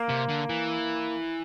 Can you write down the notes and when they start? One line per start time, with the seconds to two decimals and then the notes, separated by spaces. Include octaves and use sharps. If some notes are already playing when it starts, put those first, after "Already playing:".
Already playing: A#3
0.09 C3
0.29 D3
0.50 E3